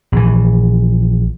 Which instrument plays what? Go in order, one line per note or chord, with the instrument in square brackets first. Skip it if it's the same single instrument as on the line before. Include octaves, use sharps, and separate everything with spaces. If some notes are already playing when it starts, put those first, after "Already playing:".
[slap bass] A#1 E3